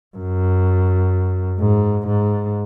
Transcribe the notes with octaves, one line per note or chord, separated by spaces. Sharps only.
F#2
G#2
G#2